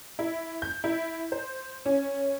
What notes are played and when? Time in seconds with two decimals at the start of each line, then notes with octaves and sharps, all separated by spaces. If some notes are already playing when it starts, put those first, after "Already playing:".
0.19 E4
0.62 G6
0.84 E4
1.32 C5
1.86 C#4